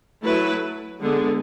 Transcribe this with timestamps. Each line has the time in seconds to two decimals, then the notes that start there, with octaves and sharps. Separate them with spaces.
0.25 F#3 A3 E4 B4
1.00 D3 G#3 B3